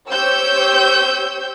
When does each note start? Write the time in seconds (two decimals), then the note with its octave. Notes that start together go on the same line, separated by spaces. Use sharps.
0.10 G4 C5 C#5 E6 G6